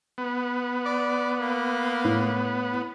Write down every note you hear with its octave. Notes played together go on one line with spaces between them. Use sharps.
B3
D5
A#3
A2